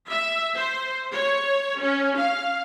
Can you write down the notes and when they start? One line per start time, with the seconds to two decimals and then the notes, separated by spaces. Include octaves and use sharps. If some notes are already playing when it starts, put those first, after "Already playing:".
0.11 E5
0.56 C5
1.14 C#5
1.79 C#4
2.18 F5